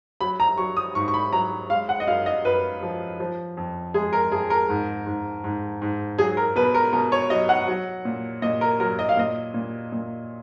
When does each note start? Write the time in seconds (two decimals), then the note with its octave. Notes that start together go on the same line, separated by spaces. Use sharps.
0.21 F#3 B5
0.40 A#5
0.58 F#3 C#6
0.77 D#6
0.95 G#2 C#6
1.08 C#6
1.14 B5
1.33 F#3 A#5
1.70 G#3 F5
1.89 F#5
2.00 D#5
2.07 F#2 F5
2.26 D#5
2.45 F#2 B4
2.82 F3
3.20 F3
3.57 F2
3.94 G#3 G#4
4.13 A#4
4.32 F2 G#4
4.50 A#4
4.69 G#2
5.06 G#2
5.44 G#2
5.82 G#2
6.18 F#3 G#4
6.37 A#4
6.56 B2 B4
6.75 A#4
6.93 B2 A#4
7.12 C#5
7.30 F#3 D#5
7.49 F#5
7.68 F#3
8.05 A#2
8.42 A#2 D#5
8.61 A#4
8.80 F#3 A#4
8.99 D#5
9.09 F5
9.17 A#2 D#5
9.54 A#2
9.92 A#2